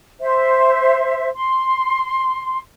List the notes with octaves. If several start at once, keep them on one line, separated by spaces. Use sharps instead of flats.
C5 E5
C6